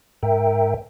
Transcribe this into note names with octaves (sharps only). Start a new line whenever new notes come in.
G#2 A#4 E5 G5